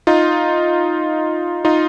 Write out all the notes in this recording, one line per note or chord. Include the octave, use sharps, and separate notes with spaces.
D#4 F4
D#4 F4